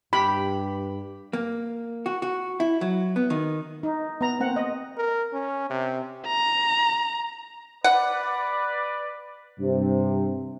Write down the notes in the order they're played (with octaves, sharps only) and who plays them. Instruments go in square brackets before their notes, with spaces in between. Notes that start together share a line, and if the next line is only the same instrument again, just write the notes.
[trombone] G2 [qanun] G4 [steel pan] B5
[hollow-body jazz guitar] A#3
F#4
F#4
E4
F#3
B3
D#3
[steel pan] D#4
B3 A#5
A#3 C4 F#5
D#5
[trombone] A#4
C#4
C3
[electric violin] A#5
[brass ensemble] B4 D5 [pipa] F#5
[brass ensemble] G2 C3